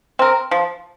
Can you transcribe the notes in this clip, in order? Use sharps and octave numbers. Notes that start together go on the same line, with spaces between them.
C4 A#4
F3